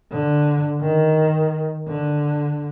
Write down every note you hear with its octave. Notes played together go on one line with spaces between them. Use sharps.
D3
D#3
D3